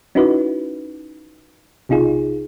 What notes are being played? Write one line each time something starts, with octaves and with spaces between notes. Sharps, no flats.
C#4 D#4 E4 F#4 B4
B1 C3 D#4 F4 G#4